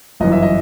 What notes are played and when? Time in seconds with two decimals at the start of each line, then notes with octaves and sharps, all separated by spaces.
0.20 G1 F#2 E3 D#5
0.32 E5
0.43 D#5